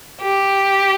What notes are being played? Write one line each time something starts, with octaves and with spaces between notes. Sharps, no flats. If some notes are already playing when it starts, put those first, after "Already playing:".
G4